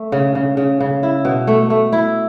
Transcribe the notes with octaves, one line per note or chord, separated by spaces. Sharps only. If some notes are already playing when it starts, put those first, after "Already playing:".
Already playing: A3
C#3
C#3
C#3
C#3
E4
B2
A3
A3
E4